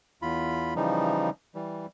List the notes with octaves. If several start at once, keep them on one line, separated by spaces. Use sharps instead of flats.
E2 F4 B5
C#3 E3 F3 G3 D#4
E3 G3